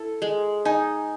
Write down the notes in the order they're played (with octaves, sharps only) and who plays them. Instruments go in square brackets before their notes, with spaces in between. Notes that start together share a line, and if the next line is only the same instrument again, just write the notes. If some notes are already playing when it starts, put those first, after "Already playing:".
Already playing: [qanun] E4 A4
G#3
[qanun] D#4 [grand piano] G#5